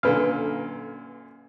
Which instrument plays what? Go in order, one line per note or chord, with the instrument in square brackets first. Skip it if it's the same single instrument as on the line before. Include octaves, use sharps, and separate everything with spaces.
[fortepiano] F#2 A#2 D3 [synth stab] A4 B4 F5